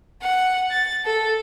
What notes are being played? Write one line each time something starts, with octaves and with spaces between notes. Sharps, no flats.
F#5
A6
A4